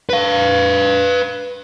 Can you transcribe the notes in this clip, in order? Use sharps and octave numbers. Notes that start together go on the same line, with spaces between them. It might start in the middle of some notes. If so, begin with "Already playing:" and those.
B4 F5